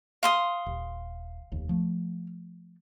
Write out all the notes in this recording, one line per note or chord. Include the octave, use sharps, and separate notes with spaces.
F5 C6 D#6
D#1
F1 D#2
F3 A3